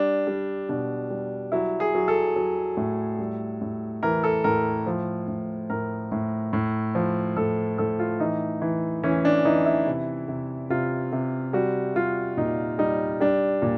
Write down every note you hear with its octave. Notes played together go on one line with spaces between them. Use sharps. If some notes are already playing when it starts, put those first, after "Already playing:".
Already playing: G3 D4
G3
B2 D4
G3
F#3 E4
G#4
F#3
A4
F#3
A2
G3
A2
E3 A#4
A4
A2 A#4
F3
A2
A2 A#4
A2
A2
F3
A2 A4
A2 A4
F4
E3 D#4
E3
E3 C#4
D4
E3 D#4
E4
C3
C3
C3 F4
C3
G3 F#4
G3 F4
A#2 D#4
G3 D#4
G3 D4
A#2